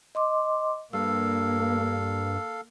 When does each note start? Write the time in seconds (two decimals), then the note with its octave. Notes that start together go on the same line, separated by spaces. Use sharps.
0.15 D#5 C6 D6
0.93 G2 A#3 A4 F5 E6